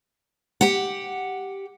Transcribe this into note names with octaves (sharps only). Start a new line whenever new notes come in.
G4 F#5